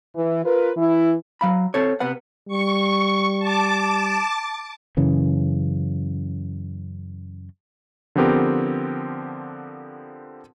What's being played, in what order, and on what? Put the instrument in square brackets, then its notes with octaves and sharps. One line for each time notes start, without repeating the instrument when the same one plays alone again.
[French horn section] E3
F4 A#4 B4
E3 E4
[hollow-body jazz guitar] F#3 F5 B5
C4 A4 C#5
C3 B3 B4 F#5
[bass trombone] G3 [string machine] C#6
[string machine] A5 D6
[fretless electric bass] F#2 C#3 E3
[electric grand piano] D3 F3 B3 C4 G4 A#4